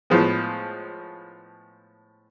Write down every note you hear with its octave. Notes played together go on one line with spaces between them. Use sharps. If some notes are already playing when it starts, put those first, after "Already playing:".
A2 F3 G#3 B3